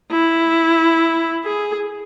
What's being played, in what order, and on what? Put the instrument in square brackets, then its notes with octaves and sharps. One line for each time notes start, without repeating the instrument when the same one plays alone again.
[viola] E4
G#4